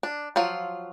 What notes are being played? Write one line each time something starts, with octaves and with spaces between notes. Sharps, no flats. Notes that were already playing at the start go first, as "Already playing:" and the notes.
D4
F3 F#3 F4